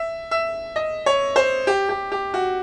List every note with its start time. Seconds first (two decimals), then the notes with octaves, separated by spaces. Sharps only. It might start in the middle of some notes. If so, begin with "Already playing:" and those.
Already playing: E5
0.31 E5
0.76 D#5
1.06 C#5
1.36 C5
1.67 G4
1.89 G4
2.12 G4
2.34 F#4